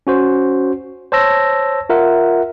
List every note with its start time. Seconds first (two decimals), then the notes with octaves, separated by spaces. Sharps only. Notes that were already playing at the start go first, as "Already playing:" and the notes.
0.07 C#4 F#4 C5
1.12 C5 C#5 A5 E6 A#6
1.90 F4 A#4 E5 F#5